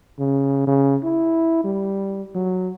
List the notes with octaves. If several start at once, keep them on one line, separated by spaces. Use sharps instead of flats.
C#3
C#3
E4
G3
F#3